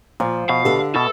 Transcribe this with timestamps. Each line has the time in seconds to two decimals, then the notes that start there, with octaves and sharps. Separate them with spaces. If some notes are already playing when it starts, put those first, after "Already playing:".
0.20 A#2 F3
0.49 B2 F5
0.65 D3 G4 A4 B4 E5
0.96 B2 A4